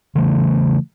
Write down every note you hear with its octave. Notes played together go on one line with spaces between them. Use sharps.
C#3 E3 A3